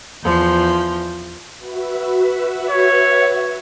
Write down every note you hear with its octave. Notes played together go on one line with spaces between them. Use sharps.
E2 F3 G6
F#4 B4 E5
C#5